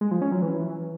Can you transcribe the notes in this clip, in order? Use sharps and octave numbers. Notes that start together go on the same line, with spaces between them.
G#3
F3
C#4
F#3
E3